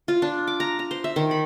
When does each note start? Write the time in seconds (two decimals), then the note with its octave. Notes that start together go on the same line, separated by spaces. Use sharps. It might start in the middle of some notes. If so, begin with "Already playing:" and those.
0.08 F4
0.22 D4
0.47 D6
0.60 A#5
0.79 A#5
0.91 C5
1.04 E5
1.16 D#3
1.31 B5